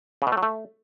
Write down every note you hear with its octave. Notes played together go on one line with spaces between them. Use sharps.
C#3
B2
A3
F#3
A3